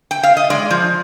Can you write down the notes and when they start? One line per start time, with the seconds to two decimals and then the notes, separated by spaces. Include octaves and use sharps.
0.11 G5
0.23 F5
0.37 D#5
0.50 G#3 D5
0.71 F3